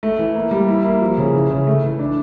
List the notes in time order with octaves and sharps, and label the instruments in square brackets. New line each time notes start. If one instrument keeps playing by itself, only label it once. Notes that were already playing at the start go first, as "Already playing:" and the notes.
[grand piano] A3
E3
A#3
G3
E4
A#3
F3
C#3
E3
C#3
A3
E3
D4